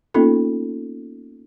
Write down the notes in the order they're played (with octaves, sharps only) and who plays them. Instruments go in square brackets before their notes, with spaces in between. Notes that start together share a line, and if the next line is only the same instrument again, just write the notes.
[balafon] A#3 B3 C#4 D#4 F4 A4